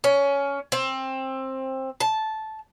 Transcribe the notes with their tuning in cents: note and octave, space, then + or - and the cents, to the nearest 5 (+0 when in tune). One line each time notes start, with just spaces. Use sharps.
C#4 +15
C4 +20
A5 -10